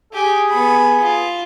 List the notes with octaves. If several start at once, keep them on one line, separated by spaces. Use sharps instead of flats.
G4 G#4 G#5
B3 B5
F4